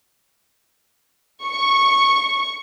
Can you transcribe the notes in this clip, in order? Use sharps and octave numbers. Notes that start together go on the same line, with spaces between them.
C#6